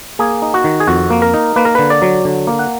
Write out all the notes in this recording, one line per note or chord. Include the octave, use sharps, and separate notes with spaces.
A#3 G#4
D#4
F#4
D#3
G#4
F2 F#4
A#3
A#4
D#4
A#3 B4
A#4
D3 B4
D5
F#3
D3
A#3
F#5